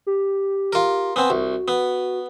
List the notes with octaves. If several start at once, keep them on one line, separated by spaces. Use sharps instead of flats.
G4
F4 A#4
B3 C4 G#5
C2 F#4
B3